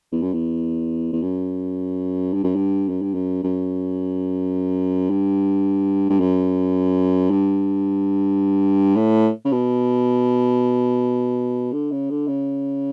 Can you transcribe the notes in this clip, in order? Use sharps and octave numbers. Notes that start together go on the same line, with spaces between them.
E2
F#2
E2
E2
F#2
G2
F#2
G2
F#2
G2
F#2
F#2
G2
G2
F#2
G2
A2
C#3
B2
D3
C#3
D3
C#3